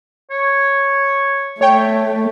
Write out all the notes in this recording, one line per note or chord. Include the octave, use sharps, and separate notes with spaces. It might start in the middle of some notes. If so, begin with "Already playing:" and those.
C#5
A3 C#5 G5